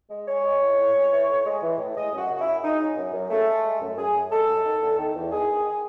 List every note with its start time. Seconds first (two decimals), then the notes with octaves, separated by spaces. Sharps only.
0.10 G#3
0.27 G#3 C#5
0.44 G#3
0.61 A2
0.78 A2
0.94 G#3
1.12 E3
1.28 A2
1.45 G#3
1.62 E3
1.78 A2
1.95 G#3 D#5
2.12 F#2
2.18 F#4
2.29 C#3
2.34 F#4
2.40 E4
2.46 F#2
2.63 G#3 D#4
2.80 C#3
2.97 F#2
3.13 F#2
3.30 C#3 A3
3.47 G#3
3.64 G#3
3.81 F#2
3.97 F#2 G#4
4.14 F#2
4.31 G#3 A4
4.48 F#2
4.65 D#3
4.81 E2
4.98 D#3
5.15 E2
5.32 D#3 G#4
5.48 D#3